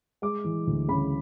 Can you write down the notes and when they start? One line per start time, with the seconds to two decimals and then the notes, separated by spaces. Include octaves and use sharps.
0.22 G#3 D6
0.44 E3
0.67 D2
0.88 C#3 B5